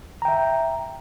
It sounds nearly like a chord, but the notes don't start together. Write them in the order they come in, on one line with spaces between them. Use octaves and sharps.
A#5 G5 E5